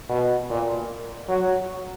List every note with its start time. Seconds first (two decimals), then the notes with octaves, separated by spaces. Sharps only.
0.09 B2
0.50 A#2
1.29 F#3